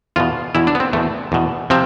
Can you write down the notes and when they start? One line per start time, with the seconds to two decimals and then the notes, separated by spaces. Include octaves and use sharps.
0.16 E2 B2 F4
0.55 E2 B2 E4
0.67 D4
0.75 B3
0.80 C4
0.93 E2 B2 A3
1.32 E2 B2
1.70 C3 F3 C4